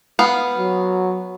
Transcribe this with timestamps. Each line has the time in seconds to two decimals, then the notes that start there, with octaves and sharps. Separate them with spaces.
0.19 B3 F5
0.58 F#3